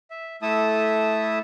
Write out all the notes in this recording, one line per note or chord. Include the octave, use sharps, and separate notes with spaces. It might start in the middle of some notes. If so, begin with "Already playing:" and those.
E5
A3 E4 A4 E5 A5 D#6